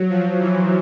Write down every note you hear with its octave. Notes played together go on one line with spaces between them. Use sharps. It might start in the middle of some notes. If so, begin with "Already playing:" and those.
Already playing: F#3
F3
E3